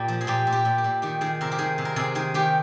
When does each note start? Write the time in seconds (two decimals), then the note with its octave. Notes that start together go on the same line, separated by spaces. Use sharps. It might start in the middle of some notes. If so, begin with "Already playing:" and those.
Already playing: A#2 G4
0.08 F3
0.21 G#4
0.27 A#2 G4
0.47 A#2
0.53 G4
0.65 A#2
0.78 G4
0.84 A#2
1.02 D#3 G4
1.21 D#3 G#4
1.41 C3 A#4
1.52 G4
1.59 D#3 G#4
1.78 C3
1.85 A#4
1.96 C3 G#4
2.15 D#3 G#4
2.34 D#3 G4